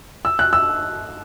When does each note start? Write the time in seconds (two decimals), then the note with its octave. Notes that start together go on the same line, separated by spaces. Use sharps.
0.25 E6
0.39 F#6
0.53 E6